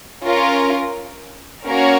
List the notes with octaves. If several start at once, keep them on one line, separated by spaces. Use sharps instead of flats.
C#4 F4 A#4
A#3 C#4 F#4 A#4 C#5